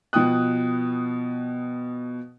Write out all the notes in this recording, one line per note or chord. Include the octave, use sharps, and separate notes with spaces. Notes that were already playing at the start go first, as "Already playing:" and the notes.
B2 F3 G5 D#6 F#6